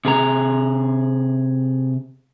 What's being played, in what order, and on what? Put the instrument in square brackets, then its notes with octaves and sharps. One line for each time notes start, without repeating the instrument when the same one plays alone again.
[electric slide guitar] C3 G#4 A#5